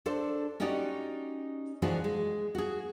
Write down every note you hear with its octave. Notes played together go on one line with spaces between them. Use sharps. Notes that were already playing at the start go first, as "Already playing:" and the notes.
D4 A4 C5
C#4 D#4 F#4 G4 D5 D#5
E3 F3 G#3 D4 F#4 G#4
G#3
F#4 G#4